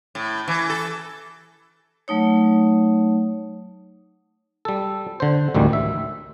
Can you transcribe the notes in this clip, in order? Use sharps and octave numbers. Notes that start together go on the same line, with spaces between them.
A2
E3
A4
F#3 A3 D#4 C#5
G3 A4
D3 C5
A1 D2 D#3 G3
E5